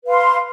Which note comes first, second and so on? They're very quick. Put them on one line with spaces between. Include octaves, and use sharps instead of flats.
B4 F5 C6